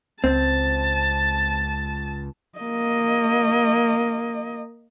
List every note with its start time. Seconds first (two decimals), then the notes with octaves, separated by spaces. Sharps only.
0.24 C#2 C4 A5
2.59 A#3 D#5